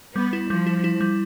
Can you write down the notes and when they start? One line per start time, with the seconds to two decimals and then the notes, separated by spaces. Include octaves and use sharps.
0.15 G3 B3
0.33 E4
0.50 F3 G3
0.66 E4
0.84 E4
1.01 G3